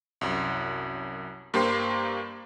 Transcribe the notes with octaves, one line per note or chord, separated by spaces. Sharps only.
C2 F#2
G2 A#3 G4 C5 C6 C7